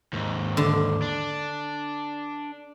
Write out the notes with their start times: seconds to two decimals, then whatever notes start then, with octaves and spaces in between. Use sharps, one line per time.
0.13 D#2 G#2
0.57 D3
1.02 D4